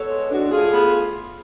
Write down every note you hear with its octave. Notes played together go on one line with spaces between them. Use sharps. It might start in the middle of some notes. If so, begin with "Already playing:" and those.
Already playing: B3 A4 C#5
G#3
A2 D4 F#4
A2 F4 G#4
B3